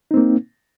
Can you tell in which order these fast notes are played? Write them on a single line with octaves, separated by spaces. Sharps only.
D#4 C4 A#3